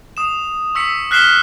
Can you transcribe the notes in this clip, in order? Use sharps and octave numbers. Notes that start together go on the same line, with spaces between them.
D#6 E7
C#6 E6 B6 C#7
F6 F#6 B6 C7 E7 G7